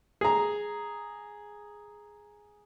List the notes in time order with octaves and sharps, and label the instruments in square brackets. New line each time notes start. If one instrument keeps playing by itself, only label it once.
[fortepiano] G#4 A#5